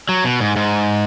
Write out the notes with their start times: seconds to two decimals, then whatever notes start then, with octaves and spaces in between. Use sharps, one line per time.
0.09 F#3
0.24 B2
0.40 G#2
0.56 G#2